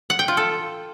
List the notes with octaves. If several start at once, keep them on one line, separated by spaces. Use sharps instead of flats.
F#5
G5
F4
A4